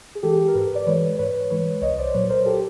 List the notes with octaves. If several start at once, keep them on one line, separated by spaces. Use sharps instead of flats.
G#4
E3 G#3 G4 A4
A4
A#4
G#2 A4 B4
D5
E3 G#3 B4 C#5
G#2 B4 C#5
E3 G#3 B4 C#5
C2 C#5 D#5
C5 D5
A#2 F#3 B4 C#5
A#4 C5
G4 A4